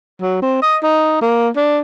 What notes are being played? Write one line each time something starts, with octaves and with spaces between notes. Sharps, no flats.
F#3
C4
D#5
D#4
A#3
D4